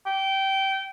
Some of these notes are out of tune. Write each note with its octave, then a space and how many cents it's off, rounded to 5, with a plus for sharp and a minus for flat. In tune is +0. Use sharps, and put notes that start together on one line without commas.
G5 -20